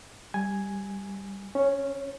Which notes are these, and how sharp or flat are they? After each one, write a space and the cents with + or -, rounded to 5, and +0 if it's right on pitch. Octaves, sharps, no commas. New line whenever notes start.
G3 +5 G#5 +0
C#4 +0 C5 +45